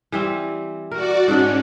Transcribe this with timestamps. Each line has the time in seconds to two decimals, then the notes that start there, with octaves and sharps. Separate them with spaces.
0.12 E3 G3 C4
0.91 F#4 A#4 D5
1.28 G#2 C#4 D4